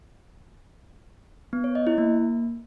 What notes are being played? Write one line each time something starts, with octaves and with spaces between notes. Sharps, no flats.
B3
C#5
D#5
E4
A#3